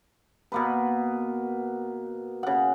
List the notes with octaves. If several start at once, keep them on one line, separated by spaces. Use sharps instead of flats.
B2 A#3 B4
C#3 F#5